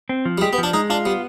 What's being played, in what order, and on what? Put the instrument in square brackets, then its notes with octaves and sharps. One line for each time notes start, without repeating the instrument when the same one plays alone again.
[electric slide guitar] C4
F3
[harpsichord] G3
[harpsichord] G#3 [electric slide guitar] G4
[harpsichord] B3
[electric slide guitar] F3
[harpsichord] D4
[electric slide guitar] G#3 [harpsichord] D#4
[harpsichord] D4 [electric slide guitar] F4
[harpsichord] G3 [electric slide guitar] B3